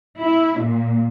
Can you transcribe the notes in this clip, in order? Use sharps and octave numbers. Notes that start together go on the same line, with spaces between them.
E4
A#2